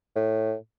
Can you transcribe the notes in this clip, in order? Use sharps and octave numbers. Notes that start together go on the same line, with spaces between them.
A2